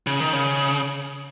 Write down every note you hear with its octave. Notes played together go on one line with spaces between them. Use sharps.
C#3
D#3
C#3